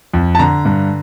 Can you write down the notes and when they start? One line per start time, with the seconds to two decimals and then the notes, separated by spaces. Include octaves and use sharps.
0.14 F2
0.35 A5
0.39 D3 A#5
0.65 G2